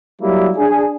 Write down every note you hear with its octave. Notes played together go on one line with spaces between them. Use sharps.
F#3 G3 A#3 E4
D4 G#4